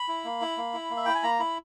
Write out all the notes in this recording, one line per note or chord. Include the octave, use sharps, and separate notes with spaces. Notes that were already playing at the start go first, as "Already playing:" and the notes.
Already playing: B5
E4
A#3
E4
A#3
E4
A#3
E5
E4 G5
G#5
A#3 A#5
E4 B5